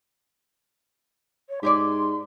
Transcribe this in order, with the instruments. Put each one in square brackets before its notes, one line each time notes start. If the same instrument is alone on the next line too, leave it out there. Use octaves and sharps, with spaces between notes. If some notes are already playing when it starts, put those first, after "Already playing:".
[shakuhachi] C#5
[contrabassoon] G#2 [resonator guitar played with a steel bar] G4 G#4 D5 [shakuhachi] C6